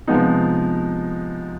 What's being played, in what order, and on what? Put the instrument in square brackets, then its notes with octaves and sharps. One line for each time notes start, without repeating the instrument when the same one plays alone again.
[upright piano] C3 F3 G#3 B3 D#4